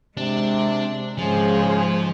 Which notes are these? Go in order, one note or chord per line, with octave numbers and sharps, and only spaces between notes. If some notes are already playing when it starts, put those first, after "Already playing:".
C3 G#3 D4
G#2 C#3 F3 G#4 C5